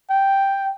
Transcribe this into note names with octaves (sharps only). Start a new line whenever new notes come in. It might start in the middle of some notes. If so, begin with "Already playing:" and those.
G5